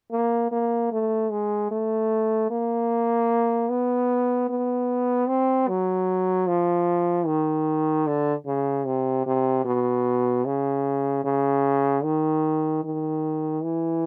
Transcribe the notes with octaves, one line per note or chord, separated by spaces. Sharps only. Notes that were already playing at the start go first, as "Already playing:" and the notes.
A#3
A#3
A3
G#3
A3
A#3
B3
B3
C4
F#3
F3
D#3
D3
C#3
C3
C3
B2
C#3
C#3
D#3
D#3
E3